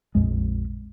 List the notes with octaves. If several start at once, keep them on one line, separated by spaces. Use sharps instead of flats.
A#1 F2 G#3